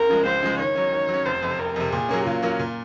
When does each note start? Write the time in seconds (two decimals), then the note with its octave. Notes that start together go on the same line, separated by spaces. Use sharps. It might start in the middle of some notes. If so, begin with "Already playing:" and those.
Already playing: C#2 A#4
0.09 C#3 F3 G#3
0.26 C#2 C5
0.43 C#3 F3 G#3
0.59 D#3 C#5
0.75 F#3 C#4
0.92 D#3
1.09 F#3
1.14 C#4
1.26 F1 C5
1.42 F2 C3
1.59 F1 A#4
1.76 F2 C3
1.92 A#2 G#4
2.09 F#3 A#3 C#4
2.25 A#2 F4
2.42 F#3 A#3 C#4
2.59 A#2